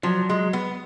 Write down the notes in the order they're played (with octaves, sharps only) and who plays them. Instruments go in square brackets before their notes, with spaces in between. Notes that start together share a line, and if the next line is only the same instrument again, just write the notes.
[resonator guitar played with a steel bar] F3 [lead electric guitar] F#3
[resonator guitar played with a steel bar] G#3
B3